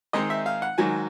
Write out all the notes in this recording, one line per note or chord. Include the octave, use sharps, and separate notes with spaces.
D#3 G#3 C4 D#4 D#5
E5
F5
F#5
G#2 D#3 F#3 G#5